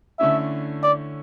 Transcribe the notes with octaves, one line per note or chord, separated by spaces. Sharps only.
D3 A3 C#4 E4 E5
D5